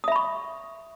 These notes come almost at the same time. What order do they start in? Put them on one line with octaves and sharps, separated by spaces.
D#6 E5 B5 C#6